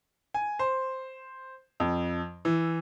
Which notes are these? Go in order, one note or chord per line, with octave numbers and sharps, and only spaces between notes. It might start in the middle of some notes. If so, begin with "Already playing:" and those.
G#5
C5
F2
E3